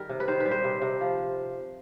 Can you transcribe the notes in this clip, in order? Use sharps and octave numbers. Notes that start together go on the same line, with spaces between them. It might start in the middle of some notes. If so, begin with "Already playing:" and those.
Already playing: D#3 G3 A#4
C3
B4
D#3 C5
B4
G3
C5
C3
C3
F3